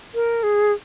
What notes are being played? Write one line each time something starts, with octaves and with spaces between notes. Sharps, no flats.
A#4
G#4